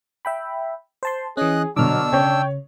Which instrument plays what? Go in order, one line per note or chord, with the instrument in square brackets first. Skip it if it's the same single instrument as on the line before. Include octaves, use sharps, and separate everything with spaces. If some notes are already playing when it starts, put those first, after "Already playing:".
[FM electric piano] E5 G5 B5
C5 A5 C6
[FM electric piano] E3 C#4 [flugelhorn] G#4 [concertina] D#5 F#6
[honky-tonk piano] B2 D3 [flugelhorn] F#3 [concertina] D4 E6 [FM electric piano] D6 F6
[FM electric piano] C#3 [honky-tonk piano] C#5 [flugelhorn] G5